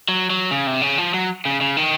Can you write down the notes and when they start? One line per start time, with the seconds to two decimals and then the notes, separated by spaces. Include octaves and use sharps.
0.09 F#3
0.30 F#3
0.51 C#3
0.67 C3
0.81 C#3
0.98 F3
1.14 F#3
1.45 C#3
1.61 C#3
1.77 D#3